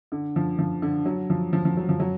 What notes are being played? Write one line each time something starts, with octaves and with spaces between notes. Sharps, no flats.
D3
F3
F3
D3
F#3
F3
F3
F3
F#3
F3
F#3